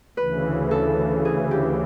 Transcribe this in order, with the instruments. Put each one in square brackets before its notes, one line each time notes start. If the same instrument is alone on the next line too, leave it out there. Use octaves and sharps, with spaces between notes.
[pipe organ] D2 C#3 E3 [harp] B4
[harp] A4
G#4
G4